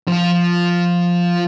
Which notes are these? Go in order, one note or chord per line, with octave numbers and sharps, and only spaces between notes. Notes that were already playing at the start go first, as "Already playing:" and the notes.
F3 F4